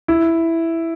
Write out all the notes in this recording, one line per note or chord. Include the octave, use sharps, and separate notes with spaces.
E4